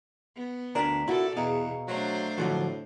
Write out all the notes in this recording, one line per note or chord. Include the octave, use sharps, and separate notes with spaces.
B3
D2 D4 A#4 D5 A#5 B6
A#2 E4 F#4 A4 D5 F#5
E2 B2 G#4 D#5 F5 A#5
F#3 A3 D4 C5
A2 D3 F3 F#3